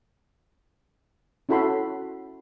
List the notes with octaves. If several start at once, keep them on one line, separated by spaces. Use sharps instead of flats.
C#4 E4 F#4 A4 B5 C6